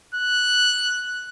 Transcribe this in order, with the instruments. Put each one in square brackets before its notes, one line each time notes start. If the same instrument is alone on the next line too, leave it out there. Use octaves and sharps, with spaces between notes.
[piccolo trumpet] F#6